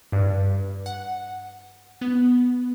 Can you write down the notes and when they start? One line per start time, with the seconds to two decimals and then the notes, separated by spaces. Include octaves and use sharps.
0.12 G2
0.86 F#5
2.01 B3